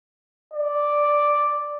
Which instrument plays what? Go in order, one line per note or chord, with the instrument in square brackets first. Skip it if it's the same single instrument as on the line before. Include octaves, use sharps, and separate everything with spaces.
[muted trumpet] D5